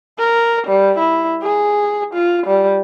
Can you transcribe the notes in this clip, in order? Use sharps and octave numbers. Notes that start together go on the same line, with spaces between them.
A#4
G3
E4
G#4
F4
G3